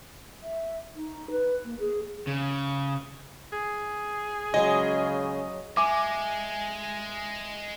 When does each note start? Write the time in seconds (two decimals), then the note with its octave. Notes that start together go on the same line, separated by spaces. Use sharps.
0.42 E5
0.95 D#4
1.30 B4
1.64 A#3
1.79 G#4
2.27 C#3
3.53 G#4
4.54 C#3 F#3 G#3 D#5
5.77 G#3 E5 G#5 D6